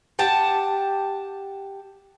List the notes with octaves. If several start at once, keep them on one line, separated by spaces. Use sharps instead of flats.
G4 F#5 A5